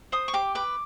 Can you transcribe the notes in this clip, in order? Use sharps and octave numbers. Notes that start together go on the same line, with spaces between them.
C5 D#6
C#6
G4 D6
B4 D6